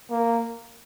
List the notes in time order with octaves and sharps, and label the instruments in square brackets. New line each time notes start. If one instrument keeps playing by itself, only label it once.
[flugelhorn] A#3